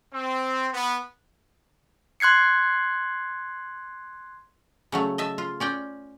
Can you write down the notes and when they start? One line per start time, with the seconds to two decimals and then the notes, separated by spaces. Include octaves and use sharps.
0.13 C4
0.73 B3
2.20 C6 F#6 G#6 C7 C#7
4.92 C#3 F#3 A3
5.18 D#5 E5 A5
5.38 F4
5.60 C#4 D5 G5